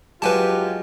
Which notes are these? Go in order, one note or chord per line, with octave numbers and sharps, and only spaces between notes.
F#3 G#3 F4 G4 B4 G#5 A5